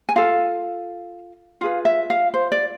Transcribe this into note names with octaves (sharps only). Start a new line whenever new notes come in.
G#5
F4 A4 F5
F4 G#4 B4 F5
E5
F5
C5
D5